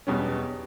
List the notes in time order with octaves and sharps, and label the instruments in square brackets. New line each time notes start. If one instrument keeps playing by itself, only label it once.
[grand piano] E2 B2 G3 C#4